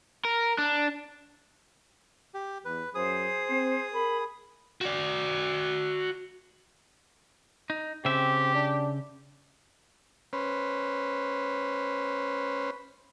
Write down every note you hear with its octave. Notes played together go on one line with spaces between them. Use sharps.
A#4
D4
G4
E2 B4
F#2 G#4 C5 D#6
C4
A#4 B5
F#4 D5
D#4
C#3 C4 G4 E5
D4
C#4 B4 C5